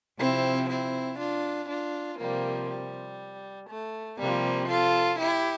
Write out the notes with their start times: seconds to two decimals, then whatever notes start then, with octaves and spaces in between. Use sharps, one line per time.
0.19 C3 F3 C4 E4
0.68 C4 E4
1.18 D4 F4
1.69 D4 F4
2.19 C3 F3 G3 A#3
2.69 G3
3.69 A3
4.18 C3 F3 G3 A#3
4.69 F4 A4
5.19 E4 G4